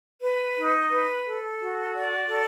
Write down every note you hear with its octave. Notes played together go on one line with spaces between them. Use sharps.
B4
D#4
B4
A4
F#4
D5
A4